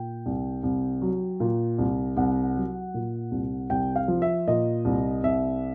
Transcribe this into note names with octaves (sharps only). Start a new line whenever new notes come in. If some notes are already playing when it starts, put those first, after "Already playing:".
Already playing: A#2 G5
C2
C2
F#3
A#2
C2
C2 F#5
F#3
A#2
C2
C2 G5
F5
F3
E5
A#2 D#5
C2
C2 E5